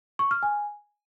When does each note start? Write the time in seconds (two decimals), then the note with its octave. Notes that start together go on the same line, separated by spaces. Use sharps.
0.19 C#6
0.31 F6
0.43 G#5